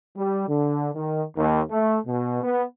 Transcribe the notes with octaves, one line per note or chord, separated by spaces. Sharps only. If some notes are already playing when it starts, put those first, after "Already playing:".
G3
D3
D#3
D#2
A3
B2
B3